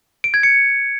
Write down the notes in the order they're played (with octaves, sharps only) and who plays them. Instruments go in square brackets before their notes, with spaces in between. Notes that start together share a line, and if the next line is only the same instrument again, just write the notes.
[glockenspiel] D7
G#6
C#7